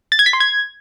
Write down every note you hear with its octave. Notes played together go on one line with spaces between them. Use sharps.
A6
G#6
B6
C6
G#6